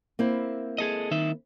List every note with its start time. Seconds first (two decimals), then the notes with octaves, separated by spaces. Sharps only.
0.19 A#3 C4 E4
0.78 G#4 A4 D#5
1.11 D#3 D#4 E5